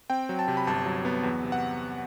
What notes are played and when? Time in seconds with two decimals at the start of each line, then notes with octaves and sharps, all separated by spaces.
0.10 C4 G5
0.29 F#3
0.39 A5
0.48 C3
0.57 B5
0.67 G1 A5
0.86 F#3
1.05 B3
1.23 E2
1.43 C3
1.52 F#5